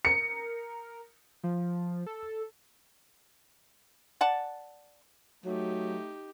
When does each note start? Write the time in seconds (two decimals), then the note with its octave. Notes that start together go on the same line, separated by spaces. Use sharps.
0.05 A#4 C#7
1.44 F3
2.06 A4
4.21 D5 F#5 A5
5.44 F#3 A3 D#4 G4